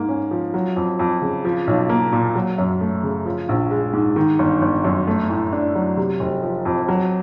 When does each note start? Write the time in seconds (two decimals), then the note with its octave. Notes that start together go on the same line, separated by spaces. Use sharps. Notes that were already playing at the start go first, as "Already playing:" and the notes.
Already playing: G#2 A#3
0.09 C#4
0.31 F3
0.54 F#3
0.76 F2
0.99 F2
1.22 C#3
1.45 F3
1.67 B1
1.89 A#3
2.12 A#2
2.35 F#3
2.58 F#2
2.81 A3
3.03 C#3
3.26 F3
3.49 A#1
3.71 G#3
3.93 G#2
4.16 D#3
4.39 G1
4.62 G1
4.84 F#2
5.07 A3
5.30 A2
5.53 D4
5.75 F#3
5.97 C3
6.20 F1
6.43 F3
6.65 F2
6.88 F#3